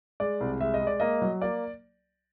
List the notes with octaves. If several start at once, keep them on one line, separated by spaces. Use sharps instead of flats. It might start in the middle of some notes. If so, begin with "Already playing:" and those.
G#3 D5
C2
G#3 E5
D#5
G#3
D5
A#3 D#5
F#3
A#3 D5